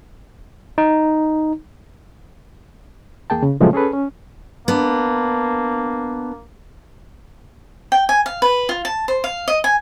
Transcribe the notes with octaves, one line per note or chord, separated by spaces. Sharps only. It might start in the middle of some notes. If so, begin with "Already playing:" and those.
D#4
E2 A#3 G#4 G5 A5
C#3
A#2 C#3 F3 F#3 G#3 A3
C#4 G#4 A4 B4
C#4
A#3 B3 D4
G5
G#5
F5
B4
F4
A5
C5
F5
D#5
G#5